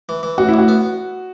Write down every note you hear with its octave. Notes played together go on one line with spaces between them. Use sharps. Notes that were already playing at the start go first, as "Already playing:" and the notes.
E3
E3
A1 F#4
E4
A1 F#4
B3